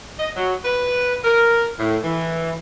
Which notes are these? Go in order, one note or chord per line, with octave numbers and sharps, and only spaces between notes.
D#5
F#3
B4
A#4
A2
E3